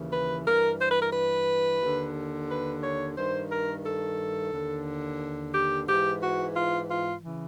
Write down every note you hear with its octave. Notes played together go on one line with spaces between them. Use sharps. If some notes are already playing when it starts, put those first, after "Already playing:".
Already playing: D#2 C#3 E3
B4
G2 E3 A#4
C5
B4
A#4
B4
D#2 D3
B4
C#5
G2 D#3 C5
A#4
A4
D#2 D3
G4
G#2 E3 G4
F#4
F4
F4
C#3 E3